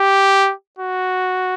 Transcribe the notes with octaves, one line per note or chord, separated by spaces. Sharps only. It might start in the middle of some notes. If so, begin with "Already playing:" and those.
Already playing: G4
F#4